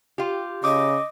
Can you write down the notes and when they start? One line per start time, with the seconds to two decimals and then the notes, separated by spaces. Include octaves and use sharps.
0.18 F4 G4
0.64 C#3 D#5 D6 D#6